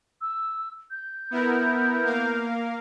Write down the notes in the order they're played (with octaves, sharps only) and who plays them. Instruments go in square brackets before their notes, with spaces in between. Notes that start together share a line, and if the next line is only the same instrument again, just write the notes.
[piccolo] E6
G6
[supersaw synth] B3 E4 A#4
A#3 A#4 F5